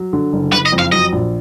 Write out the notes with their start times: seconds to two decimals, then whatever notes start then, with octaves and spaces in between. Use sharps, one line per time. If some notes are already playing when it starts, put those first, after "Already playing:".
Already playing: F#3
0.13 D3
0.33 F#1
0.53 F#1 B4
0.66 D#5
0.72 F2
0.79 F5
0.92 F#3 D#5
1.12 A#1